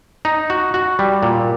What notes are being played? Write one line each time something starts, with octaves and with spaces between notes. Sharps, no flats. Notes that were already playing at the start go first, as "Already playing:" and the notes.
D#4
F#4
F#4
G3
A#2